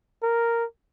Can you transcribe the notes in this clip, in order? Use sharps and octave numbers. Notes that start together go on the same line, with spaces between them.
A#4